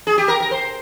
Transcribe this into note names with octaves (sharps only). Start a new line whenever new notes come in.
G#4
G4
A#4
A#4
C5